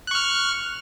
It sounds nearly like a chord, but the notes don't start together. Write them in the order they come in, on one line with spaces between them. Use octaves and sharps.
F#6 C#6 F6